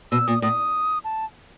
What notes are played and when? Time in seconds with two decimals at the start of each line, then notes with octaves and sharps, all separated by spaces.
0.12 B2 E6
0.27 A#2 D#6
0.42 A2 D#6
1.04 A5